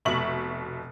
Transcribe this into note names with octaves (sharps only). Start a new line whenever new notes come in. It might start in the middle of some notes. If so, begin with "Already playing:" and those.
F1 B2 E5 C#6 F#7